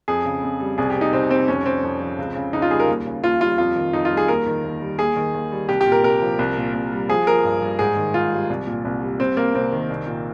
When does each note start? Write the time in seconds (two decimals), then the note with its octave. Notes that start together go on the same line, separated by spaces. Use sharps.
0.08 F2 G#4
0.25 C#3
0.43 F2
0.60 G3
0.78 C2 G#4
0.90 G4
0.96 C3
1.01 D#4
1.13 C2 C4
1.30 G3 C4
1.48 F2 C#4
1.65 C3 C4
1.83 F2
2.00 F3
2.18 C#2
2.35 C#3
2.53 C#2 D#4
2.62 F4
2.71 G3 G#4
2.80 A#4
2.88 D#2
3.06 C#3
3.24 D#2 F4
3.41 G3 F4
3.58 F2 F4
3.76 D#3
3.93 F2 D#4
4.05 F4
4.11 G3
4.17 G#4
4.28 D#2 A#4
4.46 D#3
4.64 D#2
4.81 G3
4.99 D#2 G#4
5.16 D#3
5.34 D#2
5.52 G3
5.69 C2 G4
5.81 G4
5.86 A#2
5.92 A#4
6.03 C2 A#4
6.21 F3
6.39 C2
6.57 A#2
6.74 C2
6.92 G3
7.09 F3 G#4
7.27 F3 A#4
7.44 G2
7.61 G2
7.79 G#2 G#4
7.97 D#3
8.14 G#2 F4
8.32 G3
8.50 C2
8.67 A#2
8.85 C2
9.02 G3
9.20 G3 C4
9.37 C3 A#3
9.55 C2 C4
9.72 D#3
9.90 C2
10.07 A#2